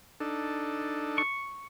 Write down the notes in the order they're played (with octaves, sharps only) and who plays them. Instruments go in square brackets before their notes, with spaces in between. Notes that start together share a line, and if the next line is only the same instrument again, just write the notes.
[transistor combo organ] D4 D#4 A4
[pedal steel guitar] C#6